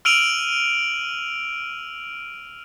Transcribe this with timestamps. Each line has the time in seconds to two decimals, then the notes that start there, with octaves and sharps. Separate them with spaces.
0.05 E6 F6 D7 D#7 F7 F#7